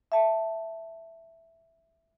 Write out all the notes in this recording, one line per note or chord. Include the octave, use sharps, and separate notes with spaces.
E5 A5